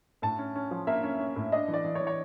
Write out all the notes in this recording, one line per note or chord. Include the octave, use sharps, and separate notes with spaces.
A2 A5
C#4
C#4
F3
A#3 E5
C#4
C#4
A2
D4 D#5
E3
D5
E3
C#5
E3
C#5